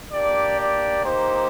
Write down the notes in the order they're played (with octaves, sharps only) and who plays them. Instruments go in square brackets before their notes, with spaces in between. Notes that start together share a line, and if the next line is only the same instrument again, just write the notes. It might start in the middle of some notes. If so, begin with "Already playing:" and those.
[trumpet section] A#3 D4 G4 D5
D5
A#3 D#4 G4 C5